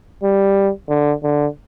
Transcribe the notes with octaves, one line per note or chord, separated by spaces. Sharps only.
G3
D3
D3